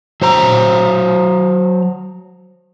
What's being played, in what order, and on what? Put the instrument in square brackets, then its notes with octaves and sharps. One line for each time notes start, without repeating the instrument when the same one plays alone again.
[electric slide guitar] F#3 C5 A#5